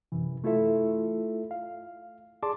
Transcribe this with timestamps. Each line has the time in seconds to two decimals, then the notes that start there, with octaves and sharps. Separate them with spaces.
0.12 F#2 C3 E3
0.44 A3 E4 F4 A4 E5
1.51 F5
2.43 G#4 D5 A5 C6 D6